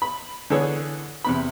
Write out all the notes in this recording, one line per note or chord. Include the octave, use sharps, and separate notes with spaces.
B5
D3 E3 B3 G#4 A4 C#5
E2 C3 B5